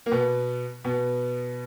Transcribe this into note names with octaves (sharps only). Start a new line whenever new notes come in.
A#3
B2 B3
B2 B3